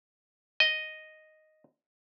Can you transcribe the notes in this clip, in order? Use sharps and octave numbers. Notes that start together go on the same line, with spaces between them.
D#5